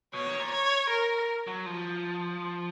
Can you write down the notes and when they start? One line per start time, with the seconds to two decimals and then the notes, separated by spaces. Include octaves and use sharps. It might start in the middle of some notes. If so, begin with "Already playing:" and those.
0.14 B2 C#5
0.26 D#3
0.40 A#2
0.52 C#5
0.90 A#4
1.47 F#3
1.66 F3